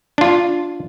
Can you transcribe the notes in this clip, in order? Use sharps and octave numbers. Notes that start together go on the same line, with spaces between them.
D4 F4